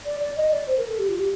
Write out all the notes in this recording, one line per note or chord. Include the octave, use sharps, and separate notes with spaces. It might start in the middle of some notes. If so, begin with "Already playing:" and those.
D5
D5
D#5
D5
C5
A#4
A4
G4
F4
G4